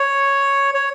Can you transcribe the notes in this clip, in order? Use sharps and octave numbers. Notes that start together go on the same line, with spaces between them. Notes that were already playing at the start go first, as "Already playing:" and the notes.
Already playing: C#5
C#5